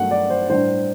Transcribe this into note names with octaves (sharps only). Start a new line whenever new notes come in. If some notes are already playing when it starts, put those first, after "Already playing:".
Already playing: G2 F#3 A3 F#5
D5
C5
A2 G3 D4 C5